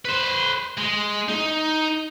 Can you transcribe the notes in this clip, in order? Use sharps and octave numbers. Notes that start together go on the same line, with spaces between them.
B4 C5
G#3
D#4